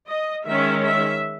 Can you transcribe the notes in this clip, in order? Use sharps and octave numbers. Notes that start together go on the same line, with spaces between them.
D#5
D#3 G#3 C#4 E5
E5